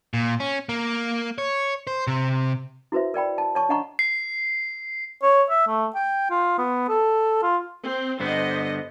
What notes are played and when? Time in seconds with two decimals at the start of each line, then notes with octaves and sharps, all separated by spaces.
0.14 A#2
0.40 C#4
0.69 A#3
1.38 C#5
1.87 C5
2.07 C3
2.92 E4 F#4 B4 C5 E5
3.14 A#4 D5 G5 B5
3.38 A5
3.55 C#5 A5 C#6
3.69 D4 D#5 F#5 A#5 C#6
3.99 C7
5.23 C#5
5.50 E5
5.67 A3
5.95 G5
6.31 F4
6.58 B3
6.89 A4
7.43 F4
7.83 C4
8.20 G2 D3 B3 C5 D#5